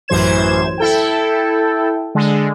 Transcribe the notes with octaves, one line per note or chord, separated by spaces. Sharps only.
A1 F#2 E3 C5 G#6 E7
E4 A4 G5
D3 G#3